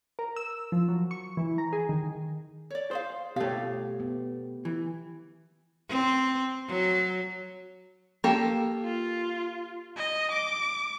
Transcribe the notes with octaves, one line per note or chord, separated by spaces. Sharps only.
A#4
E6
F3
F#3
C#6
E3
A#5
G#4
D#3
C#5 D5
G#4 C5 D5 F5
B2 A3 G4 C#5 F5
B3
E3
C4
F#3
A#3 G4 A4
F4
D#5
D6